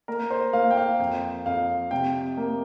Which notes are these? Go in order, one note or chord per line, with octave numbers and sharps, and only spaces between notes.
A#3 A#4
C5
A#3 F5
G5
F5
F2 G5
F2 F5
C3 G5
A#3